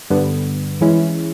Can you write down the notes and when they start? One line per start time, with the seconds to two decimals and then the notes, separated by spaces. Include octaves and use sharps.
0.10 G2 D3 G3 B3
0.81 E3 G#3 C#4 E4